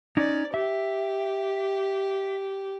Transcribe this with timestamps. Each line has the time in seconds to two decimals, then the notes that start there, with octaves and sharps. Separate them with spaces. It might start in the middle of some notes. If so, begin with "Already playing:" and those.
0.17 C#4 D#4 D5
0.54 G4 E5